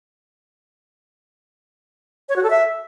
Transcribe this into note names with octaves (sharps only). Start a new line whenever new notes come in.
C#5
F#4
A4
E5